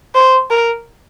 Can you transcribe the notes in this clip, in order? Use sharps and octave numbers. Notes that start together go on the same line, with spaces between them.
C5
A#4